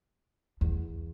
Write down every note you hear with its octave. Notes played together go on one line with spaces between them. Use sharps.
E2